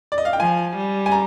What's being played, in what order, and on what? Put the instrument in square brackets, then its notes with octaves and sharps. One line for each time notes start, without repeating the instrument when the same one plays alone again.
[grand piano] D5
D#5
F5
G5
[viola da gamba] F3 [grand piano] G#5
[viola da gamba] G3
[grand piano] G#5
A#5